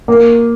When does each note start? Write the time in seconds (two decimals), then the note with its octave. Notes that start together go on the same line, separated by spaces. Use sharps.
0.08 A#3